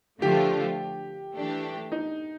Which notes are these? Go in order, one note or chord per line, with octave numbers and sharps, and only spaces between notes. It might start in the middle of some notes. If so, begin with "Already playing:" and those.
D3 F3 A3 D4 F4 G4
E3 A3 D4 G4
D#4